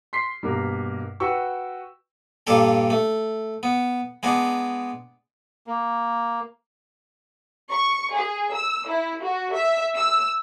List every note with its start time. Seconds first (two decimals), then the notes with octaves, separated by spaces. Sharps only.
0.13 C6 B6 C7
0.43 G2 B2 A#3 A#4
1.20 F#4 B4 G5 C#6 E6
2.47 G2 A#2 D4 G4 A4
2.90 A3
3.63 B3
4.23 G#3 B3 D4
5.67 A#3
7.71 C#6
8.13 G#4
8.52 E6
8.88 E4
9.23 F#4
9.54 E5
9.96 E6